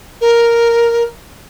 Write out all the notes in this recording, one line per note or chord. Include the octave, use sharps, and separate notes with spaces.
A#4